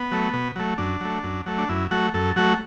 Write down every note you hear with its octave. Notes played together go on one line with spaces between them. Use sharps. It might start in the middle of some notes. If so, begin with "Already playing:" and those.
Already playing: B3
F#3 A3
B2
F#3 A3
F#2 D4
F#3 A3
F#2
F#3 A3
D4
F#2 E4
F#3 A3 F#4
F#2 A4
F#3 A3 F#4